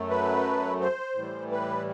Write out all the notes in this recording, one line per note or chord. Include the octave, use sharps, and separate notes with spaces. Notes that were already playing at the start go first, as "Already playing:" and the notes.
Already playing: F#2 F#3 A3
B4
C5
A2 E3 G3
B4